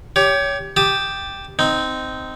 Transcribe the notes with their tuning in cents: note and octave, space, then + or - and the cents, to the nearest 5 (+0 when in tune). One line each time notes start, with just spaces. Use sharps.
G4 +0 C#5 +25
G4 +0 A5 +0 D#6 +0
C4 -15 D#4 +0